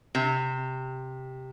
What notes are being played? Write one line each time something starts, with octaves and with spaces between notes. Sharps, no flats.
C3